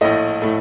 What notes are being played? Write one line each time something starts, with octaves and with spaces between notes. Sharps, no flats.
A#1 A2 A3 D#5
A2 A3